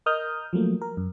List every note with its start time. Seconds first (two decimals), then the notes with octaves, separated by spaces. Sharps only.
0.06 A#4 D#5 D#6 F6 G6
0.53 F3 F#3 A3 A#3
0.81 A#4
0.97 F#2